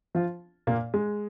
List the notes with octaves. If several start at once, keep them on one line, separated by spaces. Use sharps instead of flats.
F3 F4
A#2 A#3
G#3